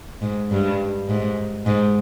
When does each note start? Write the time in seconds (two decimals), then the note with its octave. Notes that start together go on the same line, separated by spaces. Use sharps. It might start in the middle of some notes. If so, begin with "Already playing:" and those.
0.22 G#2
0.51 G2
1.08 G#2
1.66 G#2